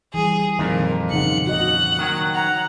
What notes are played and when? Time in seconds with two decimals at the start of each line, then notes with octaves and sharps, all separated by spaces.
0.14 E3 G3 G#4
0.59 F2 A#2 D#3 A#4
1.11 C#3 D#4 F#5 C#7 F#7
1.47 F#4 D#5 F#5
1.99 D#3 F#3
2.34 F#5 A#5